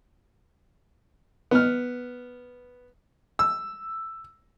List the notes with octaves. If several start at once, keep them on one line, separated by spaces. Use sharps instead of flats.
B3 F6
E6